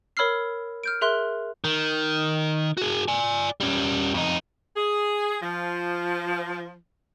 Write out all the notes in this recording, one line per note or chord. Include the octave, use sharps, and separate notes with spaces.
A#4 C#5 B5 E6 F6 C7
F6 G6 D7
G#4 A#4 E5 C6 F#6
D#3
F#4 G#4
D5 G#5
G3 C#4
F2 D#4
G#4
F3